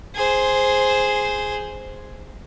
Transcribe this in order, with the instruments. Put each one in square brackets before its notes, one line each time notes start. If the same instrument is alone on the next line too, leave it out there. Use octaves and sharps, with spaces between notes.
[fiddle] G#4 C5